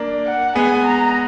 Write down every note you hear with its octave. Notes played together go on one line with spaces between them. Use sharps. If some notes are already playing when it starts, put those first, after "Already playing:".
Already playing: A#3 D4
F#5
G#3 B3 G#5
A#5